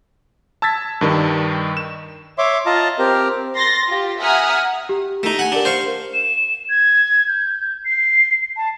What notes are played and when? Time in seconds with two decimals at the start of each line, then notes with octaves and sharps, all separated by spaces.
0.62 A5 E6 G#6 A6 B6
1.01 G2 D#3 G3 D4
1.77 E7
2.38 C#5 E5 C6 D6
2.66 F4 D#5 F5 A5 A#5
2.99 C4 G4 A#4
3.55 C6 A6 A#6
3.87 F4 G4
4.21 E5 F#5 G#5 A#5 D#6 F6
4.89 G4
5.23 A3 D#4
5.39 F#5 G#5
5.52 D4 G4 A#4
5.65 C5 F5 C#6
6.14 E7
6.70 G#6
7.28 G6
7.85 C7
8.57 A5